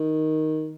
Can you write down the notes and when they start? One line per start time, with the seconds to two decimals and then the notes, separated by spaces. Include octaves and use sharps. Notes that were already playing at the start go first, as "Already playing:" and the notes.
Already playing: D#3